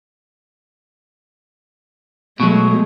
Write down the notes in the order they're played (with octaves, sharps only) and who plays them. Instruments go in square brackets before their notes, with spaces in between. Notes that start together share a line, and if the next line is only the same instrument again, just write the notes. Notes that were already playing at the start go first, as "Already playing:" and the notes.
[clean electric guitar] B2 F#3 [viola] G#3 A3